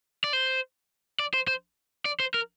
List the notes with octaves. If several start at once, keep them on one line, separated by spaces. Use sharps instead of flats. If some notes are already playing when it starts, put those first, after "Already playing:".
D5
C5
D5
C5
C5
D5
C5
A#4